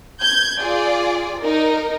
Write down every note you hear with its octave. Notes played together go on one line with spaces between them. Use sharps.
G6 G#6
F4 G#4 D5
D#4 A#4